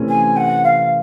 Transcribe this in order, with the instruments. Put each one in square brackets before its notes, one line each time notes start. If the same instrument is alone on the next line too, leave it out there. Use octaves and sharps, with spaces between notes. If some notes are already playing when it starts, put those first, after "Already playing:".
Already playing: [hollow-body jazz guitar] C3 E3 A3 C#4
[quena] G#5
F#5
F5